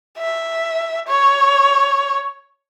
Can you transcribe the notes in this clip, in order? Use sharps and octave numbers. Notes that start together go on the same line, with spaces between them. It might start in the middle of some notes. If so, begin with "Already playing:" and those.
E5
C#5